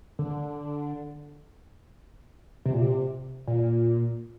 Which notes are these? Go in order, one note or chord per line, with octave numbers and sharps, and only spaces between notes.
D3
C3
A#2
C3
A#2